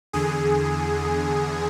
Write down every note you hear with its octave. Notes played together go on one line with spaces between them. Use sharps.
E2 D3 G#4